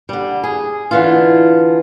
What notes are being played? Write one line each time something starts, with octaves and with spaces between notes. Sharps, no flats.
D3 G3
G#4
D3 E3 F4